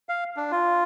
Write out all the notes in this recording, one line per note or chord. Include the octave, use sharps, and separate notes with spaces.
F5
D4
F4